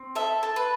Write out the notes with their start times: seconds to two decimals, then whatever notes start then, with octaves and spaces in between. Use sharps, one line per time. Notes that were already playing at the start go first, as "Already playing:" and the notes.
Already playing: C4
0.15 A4 E5
0.43 A4
0.56 B4